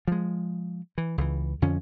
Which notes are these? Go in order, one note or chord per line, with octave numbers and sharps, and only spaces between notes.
F3 G#3
E3
C#2 E3
F2 D3 F3 C#4